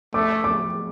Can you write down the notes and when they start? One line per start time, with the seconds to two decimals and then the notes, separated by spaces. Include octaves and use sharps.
0.14 A3 D6
0.44 D6